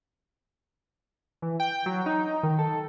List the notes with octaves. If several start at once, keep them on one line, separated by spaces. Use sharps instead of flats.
E3
G5
F#3
D#4
D#3
A4